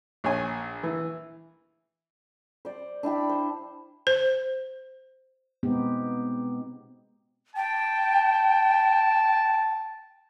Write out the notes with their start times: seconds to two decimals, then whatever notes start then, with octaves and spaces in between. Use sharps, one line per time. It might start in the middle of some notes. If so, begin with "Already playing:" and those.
0.24 A#1 C#5 G#5
0.83 E3
2.65 C5 D5
3.03 D4 E4 G5 B5
3.29 C5
4.07 C5
5.63 B2 G#3 B3 C4 D#4 G4
7.56 G5 A5